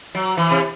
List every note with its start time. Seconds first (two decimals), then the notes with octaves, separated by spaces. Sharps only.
0.15 F#3
0.37 E3
0.50 C3